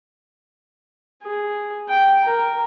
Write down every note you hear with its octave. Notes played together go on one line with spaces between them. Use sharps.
G#4
G5
A#4